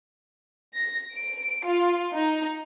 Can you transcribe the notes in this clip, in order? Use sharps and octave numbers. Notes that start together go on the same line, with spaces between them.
A#6
D7
F4
D#4